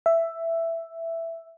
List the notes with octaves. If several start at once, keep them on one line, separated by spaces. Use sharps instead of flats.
E5